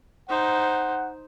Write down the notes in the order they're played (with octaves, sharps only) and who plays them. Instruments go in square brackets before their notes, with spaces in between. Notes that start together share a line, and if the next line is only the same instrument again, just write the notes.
[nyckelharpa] D#4 C5 [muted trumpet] F#5